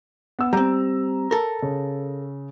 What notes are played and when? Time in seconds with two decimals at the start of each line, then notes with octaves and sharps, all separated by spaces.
0.39 B3 E6
0.53 G3 C4 A#5
1.31 A4 A#4
1.62 C#3